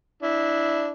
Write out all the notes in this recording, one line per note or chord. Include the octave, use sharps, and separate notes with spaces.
D4 E4